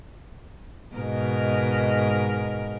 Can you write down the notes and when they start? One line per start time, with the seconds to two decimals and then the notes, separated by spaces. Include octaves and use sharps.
0.95 G#2 B2 A#4